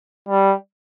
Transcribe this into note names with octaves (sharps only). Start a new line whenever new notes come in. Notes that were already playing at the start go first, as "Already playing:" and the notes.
G3